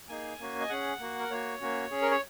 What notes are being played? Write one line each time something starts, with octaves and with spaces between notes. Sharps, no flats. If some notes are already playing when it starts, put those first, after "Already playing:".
A#3 D#4 G#4 G#5
A#3 C#4 F#4
D#5
C#4 G#4 F#5
A#3 F#4
A#4
A#3 F#4 C#5
A#3 C#4 F#4
C#4 G#4
A#4
C#5